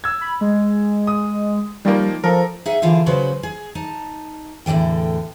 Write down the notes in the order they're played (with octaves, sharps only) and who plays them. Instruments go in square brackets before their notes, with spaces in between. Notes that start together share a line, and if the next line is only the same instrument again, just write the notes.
[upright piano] E6 G#6
[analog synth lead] B5
G#3
[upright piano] D#6
[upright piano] D#3 F3 A#3 [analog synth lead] G3
[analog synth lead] F3 [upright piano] A4 A#4
[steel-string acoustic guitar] D#4 G#4 E5 F#5
D3 E3 F4 G#4 C5 F5
C#3 F#3 F#4 B4 C5
G#4
D#4 A5
E2 A2 D3 E3 G5